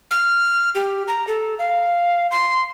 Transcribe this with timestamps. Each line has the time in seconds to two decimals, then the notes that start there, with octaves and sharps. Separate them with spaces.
0.11 F6
0.75 G4
1.08 A#5
1.28 A4
1.59 F5
2.31 C6